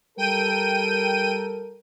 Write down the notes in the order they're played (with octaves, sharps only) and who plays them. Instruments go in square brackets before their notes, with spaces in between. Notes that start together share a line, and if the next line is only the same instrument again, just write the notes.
[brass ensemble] G3 A4 A#4 [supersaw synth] G5 D#7